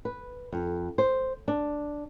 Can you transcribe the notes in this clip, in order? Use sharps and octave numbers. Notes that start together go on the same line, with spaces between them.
B4
F2
C5
D4